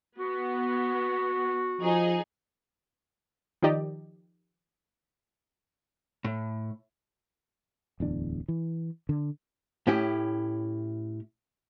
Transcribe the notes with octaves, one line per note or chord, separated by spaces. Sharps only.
B3 F#4
F3 D#4 G#4
D#3 F3 D#4 G4 D5 D#5
A2
D1 E2 D4
E3
D3
A2 C#4 E4 G4